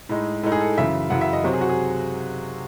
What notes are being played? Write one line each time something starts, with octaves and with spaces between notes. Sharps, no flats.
A2 G#3 D#4
A2 G#3 D#4 A4
G#4
A4
F#2 C#3 E3 E5
F#2 C#3 E3 F#5
E5
D#5
C3 F#3 C4 F#4
G#4
F#4
G#4